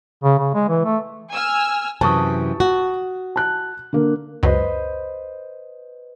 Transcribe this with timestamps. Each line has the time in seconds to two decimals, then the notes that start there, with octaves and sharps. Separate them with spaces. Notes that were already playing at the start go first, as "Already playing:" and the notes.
0.24 C#3
0.38 C#3
0.54 G#3
0.68 E3
0.85 A3
1.31 G#5 E6 F6
2.01 F#2 C3 E3 A5 C#6 D#6
2.60 F#4
3.36 A5 F#6
3.93 D3 A#3
4.43 C#2 F#2 B4 C5 D#5